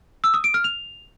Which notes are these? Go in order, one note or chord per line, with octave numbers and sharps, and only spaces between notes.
E6
D#6
D7
F6
F7